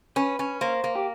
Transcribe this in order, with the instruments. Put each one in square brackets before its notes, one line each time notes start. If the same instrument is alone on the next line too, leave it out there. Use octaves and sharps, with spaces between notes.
[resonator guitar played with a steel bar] C#4 [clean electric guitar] B4
[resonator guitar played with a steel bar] C#4
[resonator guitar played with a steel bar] A#3 [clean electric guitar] C5
[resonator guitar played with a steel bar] A#3
[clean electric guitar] G4